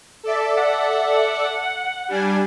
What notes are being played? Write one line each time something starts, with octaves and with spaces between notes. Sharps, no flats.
A4 D5 E5
F#5
G3 D4 G#5